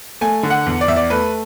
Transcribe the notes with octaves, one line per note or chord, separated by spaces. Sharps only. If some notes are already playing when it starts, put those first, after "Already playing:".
A3 G#5
D3
F#5
E2
D5
E2 E5
D5
A3 B4